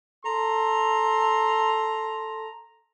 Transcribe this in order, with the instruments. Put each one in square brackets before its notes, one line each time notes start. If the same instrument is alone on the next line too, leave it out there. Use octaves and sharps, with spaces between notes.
[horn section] A4 A#5 C6